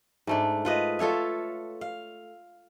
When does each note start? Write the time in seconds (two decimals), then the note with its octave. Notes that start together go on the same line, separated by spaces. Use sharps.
0.27 G#2 A3 D4
0.65 F4 B4 D#5
0.99 F4 A4 C#5 E5
1.81 F5